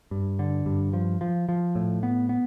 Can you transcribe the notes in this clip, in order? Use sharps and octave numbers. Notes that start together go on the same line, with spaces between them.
G2
D3
G2
F3
F3
F3
A2
B3
B3